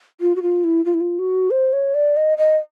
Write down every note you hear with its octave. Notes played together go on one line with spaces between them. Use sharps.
F4
F#4
F4
E4
F4
E4
F4
F#4
C5
C#5
D5
D#5
D#5